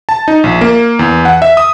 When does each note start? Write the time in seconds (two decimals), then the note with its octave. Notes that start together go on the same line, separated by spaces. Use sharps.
0.09 A5
0.28 D#4
0.44 A#1
0.61 A#3
0.99 E2
1.25 F#5
1.42 E5
1.57 D#6